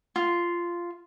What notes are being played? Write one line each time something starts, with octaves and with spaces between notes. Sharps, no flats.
F4